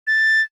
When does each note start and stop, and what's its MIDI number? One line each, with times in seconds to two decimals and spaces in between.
0.07 0.41 93